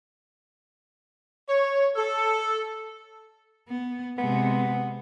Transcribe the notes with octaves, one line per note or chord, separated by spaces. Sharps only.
C#5
A4
B3
C3 G#3 B3